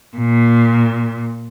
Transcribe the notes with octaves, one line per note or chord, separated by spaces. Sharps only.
A#2